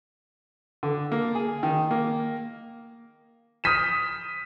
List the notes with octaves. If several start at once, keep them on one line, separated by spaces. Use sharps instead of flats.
D3
A#3
G#4
D#3
A#3
D#6 F6 G6 B6 D#7 E7